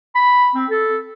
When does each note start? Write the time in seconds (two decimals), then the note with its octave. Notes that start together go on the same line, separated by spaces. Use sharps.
0.15 B5
0.55 C4
0.70 A4